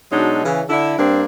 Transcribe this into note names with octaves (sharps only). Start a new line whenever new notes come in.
B2 F#3 G#3 D4 D#4
C#3 E3
D3 E4
G2 A#3 C4 D4